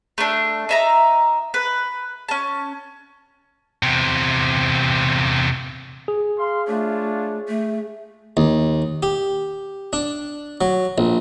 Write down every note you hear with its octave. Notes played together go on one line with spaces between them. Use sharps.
A3 D4
D#4 E5 A#5
B4
C#4 A5
E2 C3
G#4
F5 C6
A3 D4 F4 C#5
A3
D#2
G4
D4
F#3
A#1